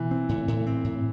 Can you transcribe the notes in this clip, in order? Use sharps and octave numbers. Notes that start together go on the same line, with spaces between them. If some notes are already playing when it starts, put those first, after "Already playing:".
Already playing: B2 E3
C4
A2
A2
C4
A2